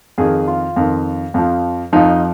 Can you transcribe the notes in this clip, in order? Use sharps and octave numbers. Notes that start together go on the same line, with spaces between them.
F2 D#3 G#4
F4
F2 D#3
F2 F3
F2 F3 D#4